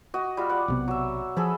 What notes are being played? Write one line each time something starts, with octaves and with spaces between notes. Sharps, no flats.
F#4 D#5
G3 F4
D5 F#5
B1 C3 B3
F#3 E5
F3 G#4 A4 B5